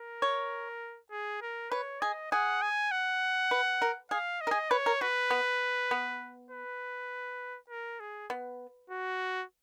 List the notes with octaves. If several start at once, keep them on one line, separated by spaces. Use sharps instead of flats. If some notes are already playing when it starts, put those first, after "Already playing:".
Already playing: A#4
C#5
G#4
A#4
B4 C#5
G#4 D#5
G#4 F#5
G#5
F#5
B4
A#4
G#4 F5
D#5
A#4
G#4
B4 C#5
A#4
F#4 B4
B3
B3
B4
A#4
G#4
B3
F#4